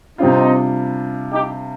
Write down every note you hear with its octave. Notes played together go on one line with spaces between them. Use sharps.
C3 G3 C4 D4 D#4 F4
D#4 G4